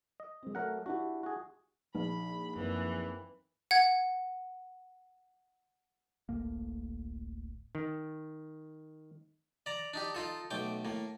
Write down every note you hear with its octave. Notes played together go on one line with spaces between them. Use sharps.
D#5
G#3 C4
F#3 A3 A#4 C#5 F#5
D4 E4 F#4 G4
F#4 G#4
A#1 D#4 B5
F#2 E3 A#3 C4
F#5 G#6
D1 A1 A2 A#3
D#3
D5 A#5
D4 D#4 G4
D#4 F4 A4
B1 A3 G5 D6
A2 A#3